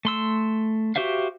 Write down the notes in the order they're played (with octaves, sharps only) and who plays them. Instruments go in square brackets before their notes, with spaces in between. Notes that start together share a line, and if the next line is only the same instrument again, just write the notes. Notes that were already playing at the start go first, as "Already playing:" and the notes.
[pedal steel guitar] A3 C6 E6
F#4 G4 C5 E5 F5